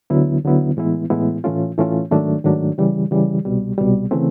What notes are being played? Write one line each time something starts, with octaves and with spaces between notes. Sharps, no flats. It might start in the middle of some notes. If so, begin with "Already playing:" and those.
D2 D3 F#3 B3 E4
D2 D3 F#3 B3 E4
A2 E3 G#3 B3 E4
A2 E3 G#3 B3 E4
A2 E3 A3 C#4 F4
A2 E3 A3 C#4 F4
G#2 D#3 F#3 A3 D4
G#2 D#3 F#3 A3 D4
C#3 E3 G3
C#3 E3 G3
C2 B2 G3
C2 B2 G3
C#3 E3 A3 C4